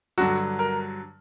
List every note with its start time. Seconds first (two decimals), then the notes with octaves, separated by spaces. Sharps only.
0.18 G2 D3 F#3 F#4
0.59 A#4